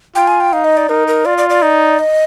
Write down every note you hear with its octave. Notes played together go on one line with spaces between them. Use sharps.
F4 G5
G#5
G5
D#4 F5
D#5
D5
D#4 A#4
A#4
F4 D5
D5
D5
D#4
D#5